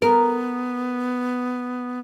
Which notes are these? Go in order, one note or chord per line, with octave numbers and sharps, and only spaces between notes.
B3 A#4